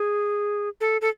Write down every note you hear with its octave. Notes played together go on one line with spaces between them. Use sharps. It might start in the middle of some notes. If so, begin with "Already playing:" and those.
Already playing: G#4
A4
A4